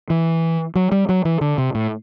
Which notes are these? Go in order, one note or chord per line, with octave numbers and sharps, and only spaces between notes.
E3
F#3
G3
F#3
E3
D3
C3
A2